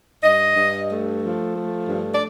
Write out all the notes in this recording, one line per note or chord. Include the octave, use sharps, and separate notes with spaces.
G2 D#5
G2
A3
F3
A3
G2
D5